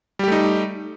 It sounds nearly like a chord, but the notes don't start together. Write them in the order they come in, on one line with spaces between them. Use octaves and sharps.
G3 G4 A3 D#4